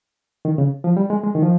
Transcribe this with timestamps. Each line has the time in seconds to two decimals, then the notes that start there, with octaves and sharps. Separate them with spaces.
0.45 D#3
0.58 C#3
0.84 F3
0.97 G3
1.10 G#3
1.23 G#3
1.35 D#3
1.43 F3